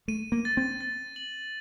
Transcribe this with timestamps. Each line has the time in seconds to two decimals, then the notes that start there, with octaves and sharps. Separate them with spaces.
0.08 A3 D#7
0.32 A#3
0.45 A6
0.57 C4
0.81 A6
1.16 F#7